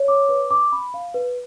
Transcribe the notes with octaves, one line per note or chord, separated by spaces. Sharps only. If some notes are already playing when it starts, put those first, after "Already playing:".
Already playing: C#5
D6
B4
D6
B5
F5
B4